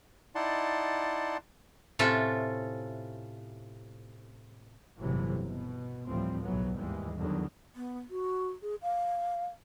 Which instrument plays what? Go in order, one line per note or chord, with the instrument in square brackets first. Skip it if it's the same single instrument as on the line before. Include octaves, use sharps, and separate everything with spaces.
[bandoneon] D#4 E4 D5 F#5 A5 C6
[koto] A2 C3 C#4 F4 A4 E5
[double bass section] G1 A2 C3 E3 F#3
B2
D2 A2 E3 F3 G3 C4
B1 G#2 E3 F#3 B3
D#2 G#2 E3 G3 G#3
E2 D3 D#3 F#3
[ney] B3
F#4
G#4
F5